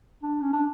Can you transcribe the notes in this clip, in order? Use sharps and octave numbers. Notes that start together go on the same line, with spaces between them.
D4
C#4
D4